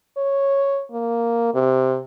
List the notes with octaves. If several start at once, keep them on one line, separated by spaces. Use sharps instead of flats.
C#5
A#3
C3